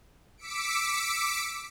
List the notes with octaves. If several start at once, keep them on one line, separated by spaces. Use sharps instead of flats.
D6 E6 B6 C#7 D7